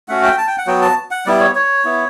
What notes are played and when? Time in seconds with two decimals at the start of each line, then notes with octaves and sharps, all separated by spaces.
0.09 A3 C#4 F#4 F#5
0.23 G5
0.38 A5
0.47 G5
0.58 F#5
0.67 F#3 B3 F#4 G5
0.82 A5
1.11 F#5
1.26 G3 B3 E4 D5
1.40 C#5
1.55 C#5
1.85 B3 E4